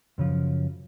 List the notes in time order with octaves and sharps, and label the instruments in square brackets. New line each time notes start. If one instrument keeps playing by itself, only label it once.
[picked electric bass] F#2 C#3 F3